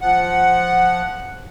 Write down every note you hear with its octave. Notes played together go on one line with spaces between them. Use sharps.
F3 F#5